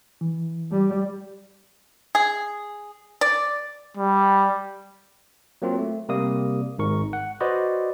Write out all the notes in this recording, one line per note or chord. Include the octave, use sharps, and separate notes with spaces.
E3
G3
G#4
D5
G3
F#3 A#3 C4 F4
A3
C3 G3 A#3 D#6
G#1 G#2 A#4 C#6
F#5
F#4 B4 C5 D5 D#5